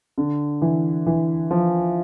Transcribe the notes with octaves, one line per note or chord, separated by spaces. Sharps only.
D3
E3
E3
F3